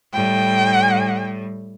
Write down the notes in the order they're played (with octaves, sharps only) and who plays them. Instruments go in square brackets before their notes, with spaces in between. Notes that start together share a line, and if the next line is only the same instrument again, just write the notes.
[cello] A2 G3 [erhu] G5